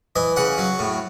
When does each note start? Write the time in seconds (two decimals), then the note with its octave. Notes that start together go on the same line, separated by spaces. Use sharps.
0.16 E3 D#5
0.36 C#3 F#5
0.58 F#3
0.79 A2